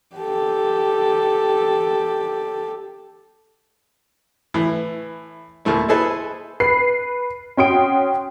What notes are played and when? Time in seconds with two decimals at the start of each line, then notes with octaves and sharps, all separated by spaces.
0.16 G4 A4
4.54 A2 E3
5.65 D#2 A#2 A3 E4
5.88 D#4 E4 G#4 A4 B4 C5
6.60 B4 C7
7.57 C#4 F#4 G5 C6 D#6 D7